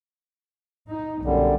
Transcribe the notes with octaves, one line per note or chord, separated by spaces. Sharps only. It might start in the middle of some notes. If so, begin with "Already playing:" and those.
D#4
B1 F#2 D3 G3